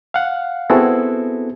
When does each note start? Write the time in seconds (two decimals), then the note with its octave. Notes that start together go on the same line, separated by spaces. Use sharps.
0.14 F5 F#5
0.70 B3 C4 E4 F#4 G#4 A4